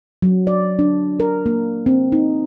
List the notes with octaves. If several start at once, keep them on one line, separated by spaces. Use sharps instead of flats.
F#3
D5
D4
A#4
A#3
C4
D#4